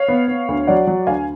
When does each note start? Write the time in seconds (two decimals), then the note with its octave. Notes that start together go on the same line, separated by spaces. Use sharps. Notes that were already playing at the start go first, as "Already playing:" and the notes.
Already playing: C#5 F5
0.08 B3
0.28 B3
0.48 D2
0.67 F#3 D5 F#5
0.87 F#3
1.07 D2 F5 G#5